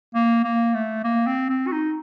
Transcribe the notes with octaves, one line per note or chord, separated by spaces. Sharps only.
A#3
A#3
A3
A#3
C4
C4
F#4
D#4